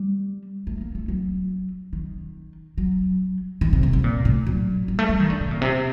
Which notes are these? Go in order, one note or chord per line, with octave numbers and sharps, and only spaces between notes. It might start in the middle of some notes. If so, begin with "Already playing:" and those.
Already playing: G3
A3
A#3
A3
F#3
D#3
F#3
D#3
C3
A#2
C3
A#2
A2
F#3
G3
A3
G3
D#3
D3
C3
A#2
C3